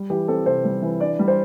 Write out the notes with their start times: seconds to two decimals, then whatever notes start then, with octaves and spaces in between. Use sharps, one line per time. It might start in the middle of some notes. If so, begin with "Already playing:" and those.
Already playing: G3
0.10 E3 G4
0.28 C4 A4
0.46 C3 C5
0.65 G3
0.82 E3
1.00 D4 D5
1.19 G3
1.28 C5